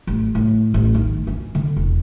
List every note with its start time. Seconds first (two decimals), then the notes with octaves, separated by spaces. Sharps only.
0.07 A1
0.35 A2
0.74 A1
0.94 D#3
1.27 C#4
1.55 D3
1.76 E1